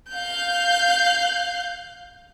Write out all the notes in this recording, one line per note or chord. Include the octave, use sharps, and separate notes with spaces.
F5 G6